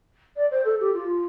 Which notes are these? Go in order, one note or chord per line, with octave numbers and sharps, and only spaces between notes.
D5
C5
A4
G4
F4